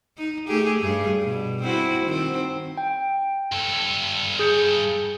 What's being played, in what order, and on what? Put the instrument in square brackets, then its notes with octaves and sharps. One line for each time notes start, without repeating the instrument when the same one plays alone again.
[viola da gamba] D#4
A3 G4 G#4
G2 G#4
B2
C4 E4 F#4
D#3 C4
[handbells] G5
[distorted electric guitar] G2 A4
[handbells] G#4 G6 C#7